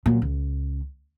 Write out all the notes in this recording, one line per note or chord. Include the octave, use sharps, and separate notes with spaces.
A#2 F#3
C#2